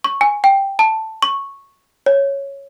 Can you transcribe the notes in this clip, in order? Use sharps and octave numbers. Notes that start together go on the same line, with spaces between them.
C#6
G#5
G5
A5
C#6
C#5